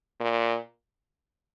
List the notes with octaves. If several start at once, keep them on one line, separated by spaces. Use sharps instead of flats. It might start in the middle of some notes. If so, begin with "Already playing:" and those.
A#2